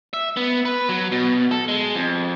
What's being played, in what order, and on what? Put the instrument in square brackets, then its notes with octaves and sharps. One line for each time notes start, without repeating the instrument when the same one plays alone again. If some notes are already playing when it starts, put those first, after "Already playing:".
[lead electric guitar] E5
B3
B4
F#3
B2
A4
G#3
F2